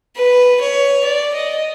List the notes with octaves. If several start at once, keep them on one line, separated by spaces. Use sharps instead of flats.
B4
C#5
D5
D#5